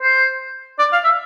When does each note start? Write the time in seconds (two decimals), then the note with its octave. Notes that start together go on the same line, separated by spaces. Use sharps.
0.02 C5
0.79 D5
0.92 F5
1.04 E5